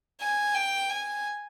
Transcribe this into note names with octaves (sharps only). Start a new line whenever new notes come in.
G#5
G5
G#5